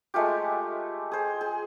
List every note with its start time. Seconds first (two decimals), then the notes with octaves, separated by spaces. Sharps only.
0.14 G#3 A3 F4 G4
1.12 G#4 C5
1.41 G#4